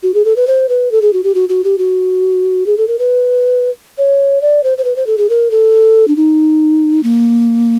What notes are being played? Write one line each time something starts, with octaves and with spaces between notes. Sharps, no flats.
F#4
G#4
A4
B4
C5
B4
A4
G#4
F#4
G4
F#4
F#4
G4
F#4
G#4
A4
A#4
B4
C#5
D5
C5
C5
B4
C5
A4
G#4
A#4
A4
D4
D#4
A#3